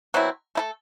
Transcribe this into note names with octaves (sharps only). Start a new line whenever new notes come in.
B2 F#3 C4 E4
A3 E4 A4